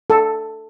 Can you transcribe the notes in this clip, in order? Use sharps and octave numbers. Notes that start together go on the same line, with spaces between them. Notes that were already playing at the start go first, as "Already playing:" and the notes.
A4